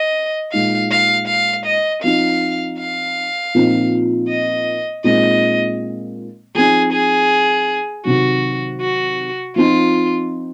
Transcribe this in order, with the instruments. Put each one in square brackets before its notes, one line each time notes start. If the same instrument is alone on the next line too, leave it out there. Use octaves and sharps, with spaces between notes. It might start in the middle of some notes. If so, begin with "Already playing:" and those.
Already playing: [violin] D#5
[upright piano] A#2 G#3 D#4 [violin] F5
[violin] F5
F5
D#5
[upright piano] F3 C4 D#4 [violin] F5
[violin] F5
[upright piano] A#2 F3 C4 D#4
[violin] D#5
[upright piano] A#2 G#3 C4 D#4 [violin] D#5
[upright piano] F3 C4 D#4 [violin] G#4
[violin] G#4
[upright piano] C3 D#3 F#3 [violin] F#4
[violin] F#4
[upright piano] F3 C4 D#4 [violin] F4